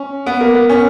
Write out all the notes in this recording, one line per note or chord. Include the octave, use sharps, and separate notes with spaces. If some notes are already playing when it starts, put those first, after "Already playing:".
Already playing: C#4
B3
A#3
B3
C#4